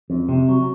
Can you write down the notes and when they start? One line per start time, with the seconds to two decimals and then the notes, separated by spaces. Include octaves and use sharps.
0.10 F2
0.29 C3
0.48 F#3